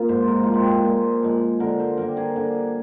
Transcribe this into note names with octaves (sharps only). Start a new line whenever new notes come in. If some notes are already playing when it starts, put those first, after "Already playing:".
Already playing: A#3 F4
G#2 C5
A#4
F3 G#3 F4
G4
G#4
A#2 C5
F3 G#3
D3 A#4
C5
G3 A#3 A#4
G#4
D3